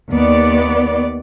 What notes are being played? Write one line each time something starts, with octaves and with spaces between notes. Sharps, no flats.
D#2 B3 D5